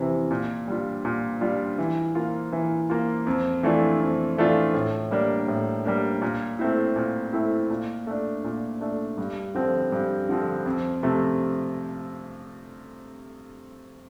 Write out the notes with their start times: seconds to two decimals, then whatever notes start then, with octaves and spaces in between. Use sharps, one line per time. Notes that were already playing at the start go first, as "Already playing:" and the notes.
Already playing: F2 C3 E3
0.31 A#2
0.68 G3 D4 F4
1.05 A#2
1.41 G3 D4 F4
1.78 E3
2.15 A#3 F4
2.52 E3
2.90 A#3 F4
3.27 F2
3.63 E3 A3 D4 F4
4.00 F2
4.38 E3 A3 D4 F4
4.74 A2
5.11 G3 A#3 D4
5.48 A2
5.85 G3 A#3 D4
6.22 A#2
6.59 A3 C4 E4
6.96 A#2
7.33 A3 C4 E4
7.70 A#2
8.07 A3 D4
8.44 A#2
8.81 A3 D4
9.17 G2
9.54 D3 F3 C4
9.92 G2
10.29 D3 F3 C4
10.66 F2
11.03 C3 F3 A3